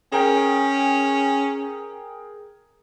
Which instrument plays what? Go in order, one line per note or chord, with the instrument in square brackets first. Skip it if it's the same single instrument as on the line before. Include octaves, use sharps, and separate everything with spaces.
[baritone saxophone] C#4 [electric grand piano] G#4 A#4 G5